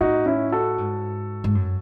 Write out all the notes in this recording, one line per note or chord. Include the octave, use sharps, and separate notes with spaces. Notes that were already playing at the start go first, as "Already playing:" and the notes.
A2 D#4 F#4
C#4 E4
F#4 A4
G#2
G#2
F#2